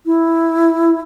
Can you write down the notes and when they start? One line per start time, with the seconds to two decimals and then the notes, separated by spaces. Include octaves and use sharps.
0.06 E4